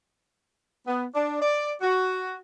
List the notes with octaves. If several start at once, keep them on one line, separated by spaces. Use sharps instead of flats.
B3
D4
D5
F#4